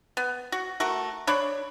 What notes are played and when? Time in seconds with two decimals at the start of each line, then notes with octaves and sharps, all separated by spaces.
0.17 B3
0.52 F#4
0.80 A3 F#4 A#4
1.27 D4 C#5 D5 B5